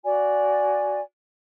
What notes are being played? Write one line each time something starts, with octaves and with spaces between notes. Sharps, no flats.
F#4 D5 G#5